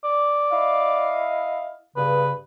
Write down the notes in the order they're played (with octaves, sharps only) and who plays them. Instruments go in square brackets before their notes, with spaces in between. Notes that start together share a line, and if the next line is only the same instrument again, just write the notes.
[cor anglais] D5
[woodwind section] E4 D#5 F5
[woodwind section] G2 C#3 [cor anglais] B4